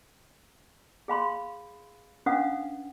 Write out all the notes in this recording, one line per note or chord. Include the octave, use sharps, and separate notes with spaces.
G#4 F5 B5 C6
C#4 D4 B4 F5 F#5 D#6